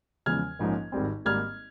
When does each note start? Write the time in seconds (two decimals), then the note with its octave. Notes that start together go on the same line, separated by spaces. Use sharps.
0.26 E2 C#3 F3 G#3 F6 G#6
0.59 A#1 G#2 F3 A#3 C#4
0.92 G#1 G#2 G3 C4
1.25 G#1 G#2 G3 A#3 F6 G#6